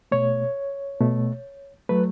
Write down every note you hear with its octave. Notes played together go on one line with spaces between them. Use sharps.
B2 A3 C#5
B2 A3
F#3 A3 B4